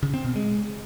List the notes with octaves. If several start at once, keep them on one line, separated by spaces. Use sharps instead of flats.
C#3
C4
B2
G#3